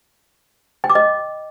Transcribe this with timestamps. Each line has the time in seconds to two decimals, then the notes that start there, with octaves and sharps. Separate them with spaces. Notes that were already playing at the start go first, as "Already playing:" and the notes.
0.84 G5
0.90 D6
0.95 D#5